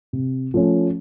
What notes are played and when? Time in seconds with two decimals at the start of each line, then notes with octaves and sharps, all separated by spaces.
0.13 C3
0.54 F3 A3 C#4